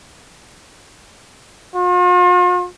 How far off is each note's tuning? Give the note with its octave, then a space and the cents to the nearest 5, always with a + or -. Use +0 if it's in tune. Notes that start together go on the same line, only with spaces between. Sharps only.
F4 +45